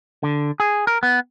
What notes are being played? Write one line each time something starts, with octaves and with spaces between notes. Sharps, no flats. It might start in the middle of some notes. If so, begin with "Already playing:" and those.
D3
G#4
A#4
B3